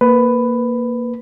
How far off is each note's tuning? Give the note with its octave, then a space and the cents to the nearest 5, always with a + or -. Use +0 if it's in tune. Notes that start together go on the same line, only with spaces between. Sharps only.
A#3 +0 B4 +10